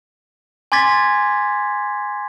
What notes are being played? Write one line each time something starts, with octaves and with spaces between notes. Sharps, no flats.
G#5 C6 D6 G#6 A6 B6